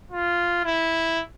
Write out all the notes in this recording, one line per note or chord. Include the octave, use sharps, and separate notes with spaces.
F4
E4